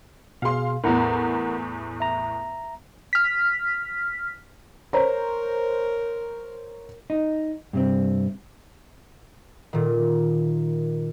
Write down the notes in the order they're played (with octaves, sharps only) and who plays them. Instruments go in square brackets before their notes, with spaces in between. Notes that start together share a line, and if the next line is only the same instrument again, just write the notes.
[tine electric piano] B2 G#4 [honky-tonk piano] F5 C6
[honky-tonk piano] E2 A2 [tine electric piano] A#4 F#5 A#5
[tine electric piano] E5 A#5
[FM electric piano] F6 B6
[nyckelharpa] A#4 [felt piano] C5 C#5 A#5
[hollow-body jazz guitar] D#4
G2 C3 C4
[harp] A#2 D#3